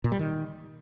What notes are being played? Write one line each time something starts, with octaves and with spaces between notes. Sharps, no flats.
A#2
G3
D#3